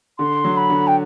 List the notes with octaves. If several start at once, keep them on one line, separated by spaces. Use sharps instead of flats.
D3 C6
F#3
B5
D3
G5